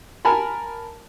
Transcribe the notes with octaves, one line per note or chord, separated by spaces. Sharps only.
A#4 G#5 A5 B5